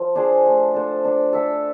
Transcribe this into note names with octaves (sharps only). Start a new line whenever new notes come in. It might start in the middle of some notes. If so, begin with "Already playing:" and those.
Already playing: F3 F5
D4 G#4 C5
A3
D4 A4 C5
D4
A4 E5